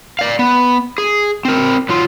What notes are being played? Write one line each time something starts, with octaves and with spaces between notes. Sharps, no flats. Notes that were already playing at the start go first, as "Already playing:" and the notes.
D5 F5
B3
G#4
C4 A#4
F#3 F4